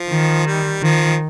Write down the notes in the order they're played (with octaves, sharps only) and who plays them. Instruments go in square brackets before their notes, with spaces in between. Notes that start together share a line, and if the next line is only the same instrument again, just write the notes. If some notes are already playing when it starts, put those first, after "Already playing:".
Already playing: [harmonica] F3
[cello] D#3
[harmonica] G3
[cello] D#3 [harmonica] F3